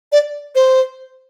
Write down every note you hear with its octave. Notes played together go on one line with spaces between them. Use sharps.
D5
C5